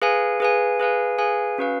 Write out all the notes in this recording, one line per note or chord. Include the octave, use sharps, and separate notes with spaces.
G#4 B4 F5 G#5
G#4 B4 F5 G#5
G#4 B4 F5 G#5
G#4 B4 F5 G#5
C#4 F#4 B4 F5